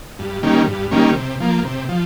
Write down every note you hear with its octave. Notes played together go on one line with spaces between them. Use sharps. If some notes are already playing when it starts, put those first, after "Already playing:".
G2
D#3 G3 A#3 C#4
G2
D#3 G3 A#3 C#4
C3
F3 A#3
C3
F3